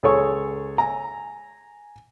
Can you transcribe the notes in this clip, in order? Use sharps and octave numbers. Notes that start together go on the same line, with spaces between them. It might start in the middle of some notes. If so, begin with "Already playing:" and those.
C#2 G#4 A4 C#5 C#6
G#5 A#5